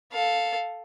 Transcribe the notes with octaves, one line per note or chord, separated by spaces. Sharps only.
A4 F5